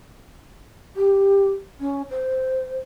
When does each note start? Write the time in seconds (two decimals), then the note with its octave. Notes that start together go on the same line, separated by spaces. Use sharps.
0.96 G4
1.80 C#4
2.10 C5